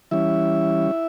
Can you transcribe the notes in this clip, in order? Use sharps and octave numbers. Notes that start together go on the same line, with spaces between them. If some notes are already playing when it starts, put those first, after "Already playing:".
E3 G3 C#4 E4 E5